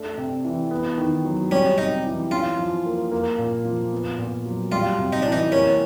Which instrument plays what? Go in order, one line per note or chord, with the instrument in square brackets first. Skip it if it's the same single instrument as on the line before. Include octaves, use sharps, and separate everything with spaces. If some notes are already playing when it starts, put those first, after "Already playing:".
Already playing: [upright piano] A3 D4
C3
E3
B3
D#3
F#3
[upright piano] G3 [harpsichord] C#4
[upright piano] C3 [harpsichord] D#4
[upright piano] E3
[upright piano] C#4 [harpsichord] F4
[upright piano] F3
A#3
A#3
A#2
F3
B3
A#2
F#3
[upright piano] G3 [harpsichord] F4
[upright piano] C3
[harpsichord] D#4
[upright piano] E3 [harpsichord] D4
[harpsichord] D#4
[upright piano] A#3 [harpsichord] C#4